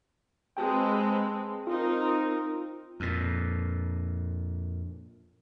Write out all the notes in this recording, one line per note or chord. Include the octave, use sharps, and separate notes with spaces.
G#3 C4 B4 G5 A5
C4 D#4 F4 A#4
F2 A#2